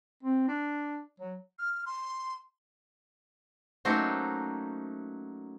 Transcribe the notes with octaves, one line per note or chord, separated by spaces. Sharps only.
C4
D4
F#3
F6
C6
F#3 A3 A#3 C#4 D#4 C5